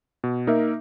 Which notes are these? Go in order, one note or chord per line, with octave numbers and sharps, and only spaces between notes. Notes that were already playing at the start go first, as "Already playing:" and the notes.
B2
A#3 D#4 A#4 E5